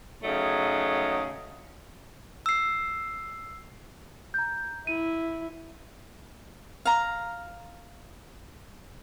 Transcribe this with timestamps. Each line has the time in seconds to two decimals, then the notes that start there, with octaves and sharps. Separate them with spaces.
0.23 C#3 F#3 A3 D#4 G#4
2.46 E6 C7
4.34 A#5 G6
4.87 E4 D#7
6.85 F5 A#5